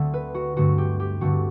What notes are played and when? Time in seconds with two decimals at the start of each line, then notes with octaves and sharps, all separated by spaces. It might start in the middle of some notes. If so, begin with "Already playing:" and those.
Already playing: D2 D3 A3 C4 D5 E5 F#5
0.14 B4
0.35 F#4
0.56 G2 D3 A3 C4 F#4
0.78 G4
1.00 G4
1.21 G2 D3 A3 C4 F#4